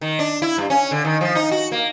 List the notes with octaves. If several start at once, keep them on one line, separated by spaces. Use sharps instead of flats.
D#3
D4
E4
G2
C#4
D3
D#3
F3
D#4
F#4
A#3